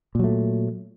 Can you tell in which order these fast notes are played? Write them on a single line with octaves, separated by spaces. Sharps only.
A#2 F#3 A3